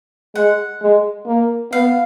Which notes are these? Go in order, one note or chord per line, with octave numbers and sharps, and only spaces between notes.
G#3 F#5
G#3
A#3
B3 F5